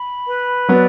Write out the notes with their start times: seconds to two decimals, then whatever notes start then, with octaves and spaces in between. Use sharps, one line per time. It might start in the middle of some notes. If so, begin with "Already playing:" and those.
Already playing: B5
0.26 B4
0.68 F#3 B3 D5